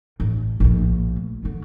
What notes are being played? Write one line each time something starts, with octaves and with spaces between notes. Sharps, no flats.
A1
A#1 A2
D3 B3